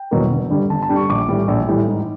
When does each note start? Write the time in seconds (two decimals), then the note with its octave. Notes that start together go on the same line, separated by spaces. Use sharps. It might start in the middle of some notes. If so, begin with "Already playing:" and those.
Already playing: G5
0.11 E2 B2 F#3 A#3
0.30 G1
0.50 G2 D3 G3
0.69 G1 A5
0.83 A5
0.89 G2 D3 G3
0.96 C#6
1.09 A#1 D6
1.28 A2 E3 G3
1.48 A#1
1.68 A2 E3 G3
1.88 G#2